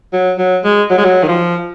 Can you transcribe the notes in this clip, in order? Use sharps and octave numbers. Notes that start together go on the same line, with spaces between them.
F#3
F#3
G#3
F#3
G#3
F#3
D#3
F3